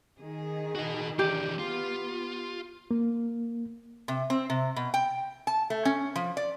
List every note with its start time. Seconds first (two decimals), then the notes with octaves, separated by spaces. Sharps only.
0.20 D#3 G#4
0.75 F#4 D#5
1.19 E3 D4 G4
1.59 B3 F4
2.91 A#3
4.08 C3
4.30 C4
4.50 C3
4.76 B2
4.94 G5
5.47 A5
5.70 A3
5.85 C#4
6.16 F3
6.37 D5